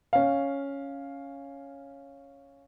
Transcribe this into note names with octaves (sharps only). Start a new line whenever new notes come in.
C#4 F5